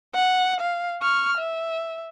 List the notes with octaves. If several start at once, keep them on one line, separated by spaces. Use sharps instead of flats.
F#5
F5
C#6 F6
E5